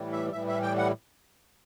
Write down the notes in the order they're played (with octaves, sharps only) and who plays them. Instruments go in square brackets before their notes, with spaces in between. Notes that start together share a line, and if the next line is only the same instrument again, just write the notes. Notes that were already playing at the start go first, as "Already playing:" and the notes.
Already playing: [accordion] A2 E3 G3
E5
A2 E3 G3 E5
E5
G5
F#5